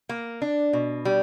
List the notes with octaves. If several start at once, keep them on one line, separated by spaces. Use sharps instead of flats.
A#3
D4
B2
G3